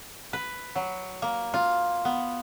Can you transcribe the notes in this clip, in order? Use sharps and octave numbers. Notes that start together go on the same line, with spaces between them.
B4
F#3
A#3
F4
B3